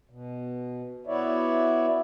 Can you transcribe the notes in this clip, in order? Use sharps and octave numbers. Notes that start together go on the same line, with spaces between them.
B2
B3 E4 F#4 C#5 D5 E5